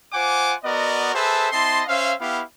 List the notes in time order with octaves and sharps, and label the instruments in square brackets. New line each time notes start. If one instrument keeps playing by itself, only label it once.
[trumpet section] F4 C5 F#5 G#5 D6
B3 F#4 A#4 D5 D#5
G#4 A4 B4 C5 E5 A5
C4 E4 D#5 A5 C6
C#4 C5 E5 F5
B3 E4 G4 F5